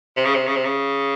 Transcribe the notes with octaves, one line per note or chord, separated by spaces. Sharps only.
C3
C#3
C3
C#3
C3
C#3